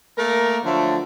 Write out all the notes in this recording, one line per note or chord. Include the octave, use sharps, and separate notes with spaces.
A3 A#3 A#4
D3 F3 F#3 A3